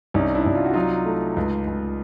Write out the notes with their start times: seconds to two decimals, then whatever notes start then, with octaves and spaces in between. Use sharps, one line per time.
0.14 C2 C#4 D#4
0.35 D4 E4
0.46 C2
0.55 F4
0.65 F#4
0.74 F#3 D#4 F4
1.06 A3
1.36 C#2
1.67 C#2